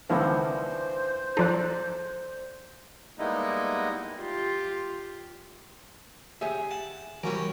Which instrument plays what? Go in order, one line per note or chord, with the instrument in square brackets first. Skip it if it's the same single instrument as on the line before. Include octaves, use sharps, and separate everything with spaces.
[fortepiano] C#2 D#3 F3 [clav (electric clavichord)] B3 D4 E4 [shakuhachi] C5
[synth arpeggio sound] F3 D#4 [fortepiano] A4 D5 F#6
[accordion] G3 G#3 A#3 B3 D#4 E4
[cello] F4 G4
[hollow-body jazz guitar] G4 G#4 E5
[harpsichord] F#5 A5
[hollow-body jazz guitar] E3 G3 [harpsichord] C#4 F#4 A#4